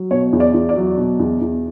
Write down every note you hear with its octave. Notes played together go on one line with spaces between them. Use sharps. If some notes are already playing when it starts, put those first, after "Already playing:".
Already playing: F#3
B2 C#5
E2
D5
E2
D5
F#3
B2
E2
E2